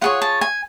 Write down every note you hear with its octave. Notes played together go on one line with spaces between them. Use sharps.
F4 G#4 C#5 F#5
A5
G#5